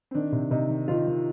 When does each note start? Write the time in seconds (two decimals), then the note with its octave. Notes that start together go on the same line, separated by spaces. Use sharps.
0.11 C4
0.15 D#3 D4
0.32 C3
0.51 C3 D#4
0.69 D#3
0.88 D#3 F4
1.07 D#3